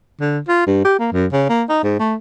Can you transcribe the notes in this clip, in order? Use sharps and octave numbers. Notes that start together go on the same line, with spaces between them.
D3
F4
G2
G4
A#3
F#2
C#3
A#3
D#4
G#2
A3